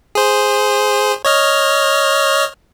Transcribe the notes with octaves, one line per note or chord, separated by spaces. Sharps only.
G#4 C5
C#5 D#5 F6